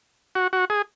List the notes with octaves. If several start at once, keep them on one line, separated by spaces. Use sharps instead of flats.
F#4
F#4
G#4